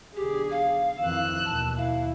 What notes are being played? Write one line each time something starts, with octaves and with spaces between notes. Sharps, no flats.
B1 D3 G4 G#4
F5
F2 D#3 E3 E6 F#6
D#2 B2 A5
E4 F5